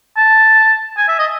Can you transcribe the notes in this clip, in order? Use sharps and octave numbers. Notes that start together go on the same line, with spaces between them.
A5
G#5
E5
D#5